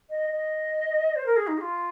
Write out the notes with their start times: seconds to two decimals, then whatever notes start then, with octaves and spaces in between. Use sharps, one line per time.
0.09 D#5
0.30 D#5
1.15 C5
1.26 A#4
1.36 G#4
1.47 D#4
1.57 G#4
1.61 F4